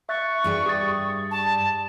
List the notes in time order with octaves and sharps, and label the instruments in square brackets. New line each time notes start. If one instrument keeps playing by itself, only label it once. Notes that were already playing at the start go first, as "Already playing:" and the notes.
[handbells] E5 F#6 A6 [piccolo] C#6
[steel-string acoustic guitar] G2 G#4 G5
[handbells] G4 D#6 A6
[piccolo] A5